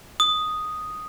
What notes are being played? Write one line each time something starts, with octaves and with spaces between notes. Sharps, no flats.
D#6